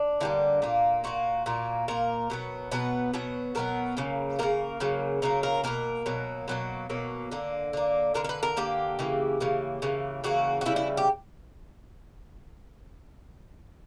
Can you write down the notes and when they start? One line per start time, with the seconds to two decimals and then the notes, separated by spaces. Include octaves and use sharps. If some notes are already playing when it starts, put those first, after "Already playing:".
Already playing: D4
0.20 D3 G3 A#3 E4
0.62 A#2 A#3
1.04 A#2 A#3 F#4
1.46 A#2 A#3
1.88 A#2 A#3 A#4
2.30 B2 F#3 B3
2.71 B2 F#3 B3 B4
3.14 B2 F#3 B3
3.55 B2 F#3 B3 A#4
3.97 C#3 F#3 A#3
4.39 C#3 F#3 A#3 A#4
4.80 C#3 F#3 A#3
5.22 C#3 F#3 A#3 A#4
5.43 A#4
5.64 B2 F#3 A#3 A#4
6.06 B2 F#3 A#3
6.48 B2 F#3 A#3
6.90 B2 F#3 A#3
7.32 D3 A#3
7.73 D3 A#3
8.14 D3 A#3 A#4
8.24 A#4
8.29 B4
8.43 A#4
8.57 D3 A#3 G4
8.99 C#3 E3 A#3
9.40 C#3 E3 A#3
9.82 C#3 E3 A#3
10.24 C#3 E3 A#3 F#4
10.61 F#4
10.66 C#3 E3 G3 E4
10.76 E4
10.97 G4